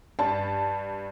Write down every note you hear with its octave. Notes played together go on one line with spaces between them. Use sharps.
G2 A5